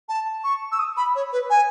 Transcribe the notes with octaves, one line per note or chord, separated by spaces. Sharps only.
A5
C#6
E6
D#6
B5
C#5
B4
G#5